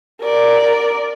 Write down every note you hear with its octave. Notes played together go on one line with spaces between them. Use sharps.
A#4 D5